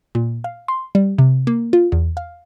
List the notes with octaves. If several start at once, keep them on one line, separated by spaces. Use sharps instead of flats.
A#2
F5
C6
G3
C3
A#3
F4
E2
F5